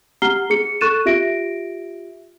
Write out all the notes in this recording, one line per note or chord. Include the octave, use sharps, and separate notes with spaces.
G4 F#5 A#5 F6 C7 G7
G#4 C#7
A4 C#6 F#6 A6 D#7 E7
F4 G4 E5 A#6 D7